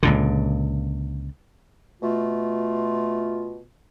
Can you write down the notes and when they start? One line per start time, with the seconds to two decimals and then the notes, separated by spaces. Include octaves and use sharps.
0.03 C#2 A#2 D3
2.03 B2 A3 F4